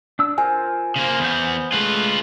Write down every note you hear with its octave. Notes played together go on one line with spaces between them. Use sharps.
D4 E6
F4 A#4 C5 G#5
C#3 A#3 C5
E2 E3 B3 C5 G6
G#3 A3 C#4 F4 B4